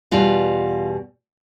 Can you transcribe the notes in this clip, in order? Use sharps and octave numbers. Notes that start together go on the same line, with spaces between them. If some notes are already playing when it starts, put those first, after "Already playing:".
E2 B2 G3 F4